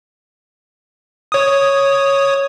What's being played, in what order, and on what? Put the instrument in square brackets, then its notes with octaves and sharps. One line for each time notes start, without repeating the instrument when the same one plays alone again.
[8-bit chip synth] C#5 D#6